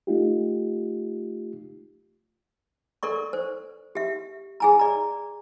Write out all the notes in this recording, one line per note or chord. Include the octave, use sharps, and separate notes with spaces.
A3 D#4 F4 G4
A4 A#4 D5 C#6
C5
G4 E5
G#4 G#5 A#5
D5 A#5